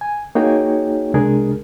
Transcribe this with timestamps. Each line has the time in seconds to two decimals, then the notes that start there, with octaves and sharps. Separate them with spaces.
0.01 G#5
0.35 A#3 D#4 F#4 G#4 C#5 G5
1.14 C2 C3 G#3 D4 G#4 A#4